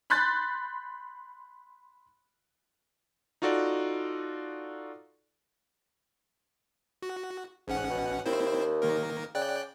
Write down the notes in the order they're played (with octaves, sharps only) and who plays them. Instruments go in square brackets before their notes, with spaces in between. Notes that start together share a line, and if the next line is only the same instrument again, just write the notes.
[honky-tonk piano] B5 C6 F#6 G6 A6
[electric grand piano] D#4 F4 F#4 A4 D5
[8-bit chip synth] F#4
[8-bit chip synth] A1 C#4 F#5 [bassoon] G#2
[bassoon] B2
[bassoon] D#2 [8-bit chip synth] C4 E4 C5
[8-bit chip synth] D#3 A#3 A#4
[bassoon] C#3 [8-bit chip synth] D5 G5 F#6